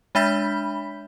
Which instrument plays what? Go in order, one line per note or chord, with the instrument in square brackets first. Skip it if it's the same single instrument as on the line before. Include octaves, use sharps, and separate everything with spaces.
[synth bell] G#3 D4 E5 B5 G6 B6